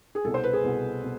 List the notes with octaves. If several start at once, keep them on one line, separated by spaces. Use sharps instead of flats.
G#4
C2 B2 A4
C5
B4
G#4
C2 B2
B2